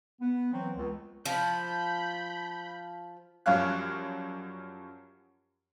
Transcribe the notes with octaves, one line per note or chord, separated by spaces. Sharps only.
B3
E3 F#3 C4
C#2
F3 B5 G6
F#2 F3 G3 C#5 F5 F#6